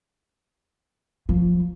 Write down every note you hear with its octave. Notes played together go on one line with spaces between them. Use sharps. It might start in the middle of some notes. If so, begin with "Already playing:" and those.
F3